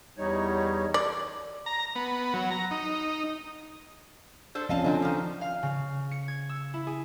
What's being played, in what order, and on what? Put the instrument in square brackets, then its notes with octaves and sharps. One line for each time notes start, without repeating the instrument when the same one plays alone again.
[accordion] E2 G3 D#4 C#5
[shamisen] D5
[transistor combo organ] A#5
B3
F#3
A#5
D#4
[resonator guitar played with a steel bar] D4 A4 C5
[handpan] F3 C4 C#4 [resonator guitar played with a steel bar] D#5 F5 A5
[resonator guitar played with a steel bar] D3 F#3 C4 [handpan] D4 A4
[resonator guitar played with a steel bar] D#3 F3
[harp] F5
C#3
C#7
G#6
E6
E4
G#4